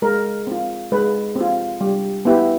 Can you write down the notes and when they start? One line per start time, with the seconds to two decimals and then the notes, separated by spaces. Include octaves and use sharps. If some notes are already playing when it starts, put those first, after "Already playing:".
0.02 G#3 A#4
0.47 C4 F4
0.92 G#3 B4
1.36 C4
1.41 F4
1.81 G3
2.25 B3 E4 G4